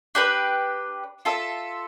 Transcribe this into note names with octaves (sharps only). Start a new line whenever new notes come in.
D4 G4 B4
F4 A4 E5